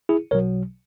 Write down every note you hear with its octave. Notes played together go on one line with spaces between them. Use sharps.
E4 G#4
B1 B2 F#3 A#4 C#5